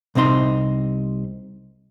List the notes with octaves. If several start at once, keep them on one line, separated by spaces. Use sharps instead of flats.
C2 C3 C4 D#4 C6